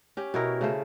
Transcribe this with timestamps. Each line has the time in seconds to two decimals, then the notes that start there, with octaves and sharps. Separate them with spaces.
0.17 C#4 G4
0.34 B2 E4 A#4
0.61 C#3 A3 C5